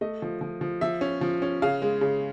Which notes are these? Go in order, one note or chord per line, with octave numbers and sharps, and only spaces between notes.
A3 D#5
F3
F3
F3
F3 E5
C#4
F3
C#4
C#3 F5
G#3
C#3